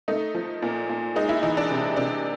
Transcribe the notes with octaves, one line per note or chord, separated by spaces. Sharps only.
A3 D#4
F3
A#2
A#2
G#3 D#4
E4
E3 D#4
D4
C3
C3 D4